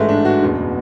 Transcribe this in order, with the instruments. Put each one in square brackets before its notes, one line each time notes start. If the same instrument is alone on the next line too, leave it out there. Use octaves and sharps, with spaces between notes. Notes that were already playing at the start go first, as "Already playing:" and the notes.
Already playing: [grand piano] A1 G#2 E3 G#3 A3
D4
F#4
F#1 E2 B2